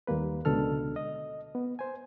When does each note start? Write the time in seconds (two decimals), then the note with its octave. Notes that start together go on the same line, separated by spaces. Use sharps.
0.07 D#2 G3 A#3 B4
0.45 C#2 B2 D3 A4 F6
0.96 D#5
1.55 B3
1.79 C5 G#5